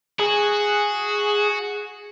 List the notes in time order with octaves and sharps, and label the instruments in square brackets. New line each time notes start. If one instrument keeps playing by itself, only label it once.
[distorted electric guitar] F#4 [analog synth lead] G#4